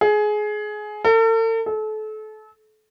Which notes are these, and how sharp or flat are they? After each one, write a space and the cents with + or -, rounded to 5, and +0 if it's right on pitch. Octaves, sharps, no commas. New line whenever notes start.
G#4 +20
A4 +45
A4 -30